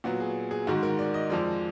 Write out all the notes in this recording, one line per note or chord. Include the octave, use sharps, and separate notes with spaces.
A#2 F#3 B3 F#4
G#4
G#4
G#2 D#3 G#3 F#4
A#4
D5
D#5
F2 F3 G#3 D5